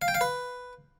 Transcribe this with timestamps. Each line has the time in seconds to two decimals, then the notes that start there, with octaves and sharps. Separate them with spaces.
0.02 F5
0.08 G5
0.14 F5
0.21 B4